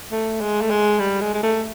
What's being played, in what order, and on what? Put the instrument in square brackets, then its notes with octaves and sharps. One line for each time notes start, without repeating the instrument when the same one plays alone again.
[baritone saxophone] A3
G#3
A3
G#3
G3
G#3
G#3
A3